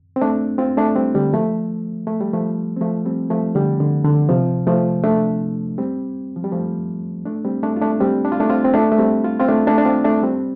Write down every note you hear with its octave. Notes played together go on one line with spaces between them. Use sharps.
C4
A3 D4
C4 F4
A3 D4
G3 C4
D3 G3
F3 A3
A3
G3
F3 A3
C4
F3 A3
G3 C4
F3 A3
D3 G3
D3
D3
C3 F3
F3 A3
A3 D4
G3 C4
F3
G3
F3 A3
A3 D4
G3 C4
A3 D4
F4
A3 D4
G3 C4
D4
F4
A3 D4
C4 F4
C4
A3 D4
A3
G3 C4
F4
C4 F4
A3 D4
A3 D4
D4
C4 F4
A3 D4
G3 C4